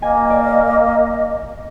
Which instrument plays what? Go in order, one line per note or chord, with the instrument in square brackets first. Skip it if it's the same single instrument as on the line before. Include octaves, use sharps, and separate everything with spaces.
[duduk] A#3 [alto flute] D#5 [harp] G#5
[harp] D5